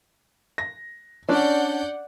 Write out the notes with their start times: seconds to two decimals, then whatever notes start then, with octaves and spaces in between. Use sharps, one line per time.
0.58 A#6
1.29 C#4 D4 D5 F#5 G6